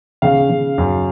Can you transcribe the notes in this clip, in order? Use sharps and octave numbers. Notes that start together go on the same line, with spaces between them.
C#3 F5
C#3
F#2